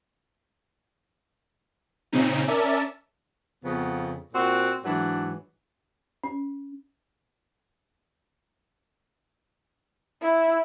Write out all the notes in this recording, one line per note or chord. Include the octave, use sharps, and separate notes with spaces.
A#2 C#3 C4 C#4 D#4
C#4 A#4 D5 E5 A5
F2 C#3 B3
A#2 C4 F#4
G#2 E3 F#3 D4
C#4
E4